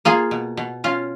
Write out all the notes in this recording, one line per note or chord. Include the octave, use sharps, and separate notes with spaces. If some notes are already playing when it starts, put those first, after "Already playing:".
A#3 F4 G#4
B2
B2
C#4 F4